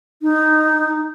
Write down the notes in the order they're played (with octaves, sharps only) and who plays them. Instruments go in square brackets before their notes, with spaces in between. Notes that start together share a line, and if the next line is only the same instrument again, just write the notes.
[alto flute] D#4